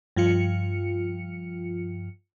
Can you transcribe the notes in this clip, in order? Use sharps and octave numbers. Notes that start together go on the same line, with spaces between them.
G2 F3 F4 C#7